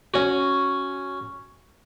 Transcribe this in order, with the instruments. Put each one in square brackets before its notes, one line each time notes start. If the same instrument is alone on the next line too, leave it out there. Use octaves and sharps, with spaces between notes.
[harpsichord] C#4 F#4